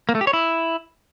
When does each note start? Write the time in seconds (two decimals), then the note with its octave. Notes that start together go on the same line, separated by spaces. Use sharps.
0.09 A#3
0.15 A3
0.21 G4
0.27 C#5
0.33 E4